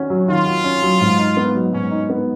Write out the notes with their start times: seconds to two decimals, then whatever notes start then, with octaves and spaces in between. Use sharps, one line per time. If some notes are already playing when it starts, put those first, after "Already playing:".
Already playing: D#3 C#4 F#4
0.10 F#3
0.28 D#3 F4
0.46 F#4
0.64 C#4
0.83 F#3
1.01 G#2
1.19 D#4
1.37 B3
1.55 F#3
1.73 G#2 C#4
1.91 D#4
2.10 B3